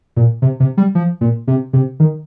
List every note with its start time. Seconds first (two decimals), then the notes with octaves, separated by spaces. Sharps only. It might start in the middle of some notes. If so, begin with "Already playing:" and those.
0.17 A#2
0.42 C3
0.60 C3
0.77 G3
0.95 F3
1.21 A#2
1.47 C3
1.73 C3
2.00 D#3